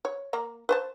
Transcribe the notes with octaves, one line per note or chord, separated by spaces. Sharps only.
C#5
A#3 A#5
B4 C5 A5